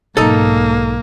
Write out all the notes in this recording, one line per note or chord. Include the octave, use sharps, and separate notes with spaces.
B1 G#2 A#3 D#4 A4